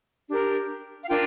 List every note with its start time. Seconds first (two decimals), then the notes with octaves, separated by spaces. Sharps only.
0.28 D4 G4 A#4
1.01 F5
1.09 D4 F4 A#4 G5